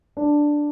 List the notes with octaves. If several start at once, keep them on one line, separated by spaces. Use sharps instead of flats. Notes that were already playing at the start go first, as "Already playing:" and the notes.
D4